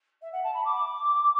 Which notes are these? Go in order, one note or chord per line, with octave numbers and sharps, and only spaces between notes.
E5
F#5
A5
B5
D6